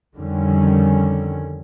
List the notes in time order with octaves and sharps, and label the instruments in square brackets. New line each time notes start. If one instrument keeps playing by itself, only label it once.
[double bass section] F2 D3 D#3 G3 C#4